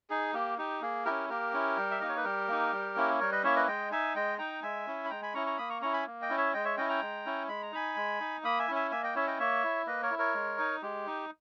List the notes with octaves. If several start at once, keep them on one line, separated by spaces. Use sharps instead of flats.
D#4 G#4
A#3 G4
D#4 G4
A#3 G#4
C#4 E4 G4 A#4
A#3 G4 A#4
C#4 E4
G3
E5
A#3 D#4 D#5
C#5
B4
G3 G4 A#4
A#3 D#4
G3
A#3 C#4 E4
G3 A#4 C#5
B4 D#5
A#3 C#4 E4 C#5 E5
B4 D#5
G#3 D#5 G5
D#4 E5 G#5
G#3 D#5 G5
D#4 G5 A#5
G#3 E5 G#5
C#4 E4
B5
G#3 G5 A#5
G#5 B5
C#4 E4 A#5 C#6
A#5 C#6
A#3 B5 D#6
A#5 C#6
C#4 E4 A#5 C#6
G#5 B5
A#3
D#5 G5
C#4 E4
C#5 E5
G#3 D#5 G5
C#5 E5
C#4 E4 D#5 G5
G5 A#5
G#3
C#4 E4
G#3 B5
A#5
D#4 G#5 B5
G#3
D#4
A#3 B5 D#6
E5 G#5
C#4 E4
E5 G#5
A#3 E5 G#5
D#5 G5
C#4 E4 C#5 E5
D#5 G5
A#3 C#5 E5
E4
A#3 B4 D#5
A#4 C#5
E4
A#4 C#5
G#3
D#4
G#3 G4
D#4